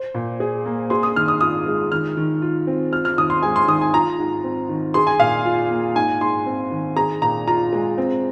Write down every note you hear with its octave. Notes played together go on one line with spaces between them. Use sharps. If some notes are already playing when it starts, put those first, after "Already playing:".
Already playing: C5
A#2
G#4
A#3
G#4 C6
D#6
D#3 F6
D#6
F4 D#6
G#3
D#3 F6
D#3
F4
C4
F4 F6
F6
D#2 D#6
C6
G#3 G#5
C6
D#3 D#6
G#5
F4 A#5
G#2
C4
D#3
G#4 C6
G#5
A#2 F5
F4
A#3
G#2 G#5
G#2 C6
C4
D#3
G#4 A#5
A#2 A#5
F4 A#5
G#3
C4